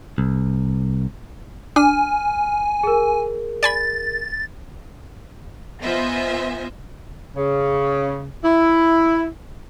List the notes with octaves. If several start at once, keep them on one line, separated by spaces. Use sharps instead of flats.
C2
D4 G#5 F6
G#4 A#4
D5 G#5 B5 A6
B3 F4 C5 D#5 E5 G#5
C#3
E4